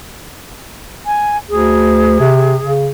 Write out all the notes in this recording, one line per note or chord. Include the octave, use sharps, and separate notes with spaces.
G#5
D2 G#4
C3
C#3